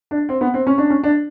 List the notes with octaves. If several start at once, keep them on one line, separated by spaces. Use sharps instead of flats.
D4
C4
B3
C4
C#4
D4
C#4
D4